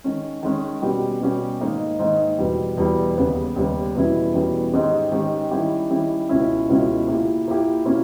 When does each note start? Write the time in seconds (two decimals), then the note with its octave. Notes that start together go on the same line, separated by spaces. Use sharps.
0.04 D#3 G#3 C#4
0.43 D#3 G#3 C#4
0.82 B2 G3 C#4 G4
1.21 B2 G3 C#4 G4
1.61 G#2 D#3 A#3 D#4
1.99 G#2 D#3 A#3 D#4
2.38 E2 B2 G3
2.77 E2 B2 G3
3.17 D#2 C#3 G3 B3
3.56 D#2 C#3 G3 B3
3.95 E2 B2 G3 C#4 E4
4.34 E2 B2 G3 C#4 E4
4.73 G#2 D#3 G#3 C#4 G4
5.12 G#2 D#3 G#3 C#4 G4
5.51 D#3 G3 C#4 E4 G4
5.90 D#3 G3 C#4 E4 G4
6.29 C#2 B2 G#3 C#4 E4
6.69 C#2 B2 G#3 C#4 E4
7.08 A#2 A#3 E4 G4
7.46 A#2 A#3 E4 G4
7.85 B2 A#3 C#4 E4 G4